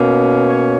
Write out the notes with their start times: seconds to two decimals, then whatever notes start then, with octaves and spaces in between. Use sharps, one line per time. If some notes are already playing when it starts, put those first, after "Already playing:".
Already playing: B2 A#3 C#4
0.48 C#5